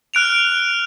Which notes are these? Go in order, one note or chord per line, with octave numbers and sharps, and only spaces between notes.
F6 F#6 D7 F7